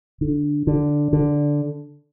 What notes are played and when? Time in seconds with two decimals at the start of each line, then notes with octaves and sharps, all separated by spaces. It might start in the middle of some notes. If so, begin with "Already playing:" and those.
0.21 D3
0.67 D3
1.13 D3